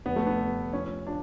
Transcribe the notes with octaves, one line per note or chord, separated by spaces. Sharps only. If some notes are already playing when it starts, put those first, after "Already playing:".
F1 B3
A3
B3
F1
F3 C#4
F3 D4